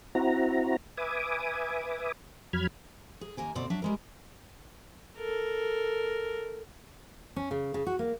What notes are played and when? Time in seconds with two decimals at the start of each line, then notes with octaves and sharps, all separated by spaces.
0.15 C4 E4 F#4 A#5
0.97 B4 E5 G#5 D6 D#6
2.53 F2 F#3 B5 F6 G#6
3.21 G#4
3.37 D#2 A#3 A#4 G#5
3.55 D2 B2 C4 D5
3.70 F#3 D4 E5
3.82 G3 G#3 A#4
5.18 A4 A#4
7.36 C#4
7.51 C#3
7.74 C#3
7.86 F#4
7.99 A#3